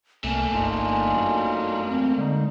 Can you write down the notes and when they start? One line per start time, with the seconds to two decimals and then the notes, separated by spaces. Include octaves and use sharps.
0.24 C2 A3 A#3 G#5
0.53 G1 D4 D#4 F4
1.15 F#2
1.88 E2 C4
2.18 D3 G#3 D#4